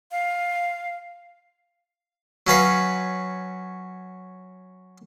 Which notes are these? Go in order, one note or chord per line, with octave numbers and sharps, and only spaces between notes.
F5
F#3 C#4 B4 F5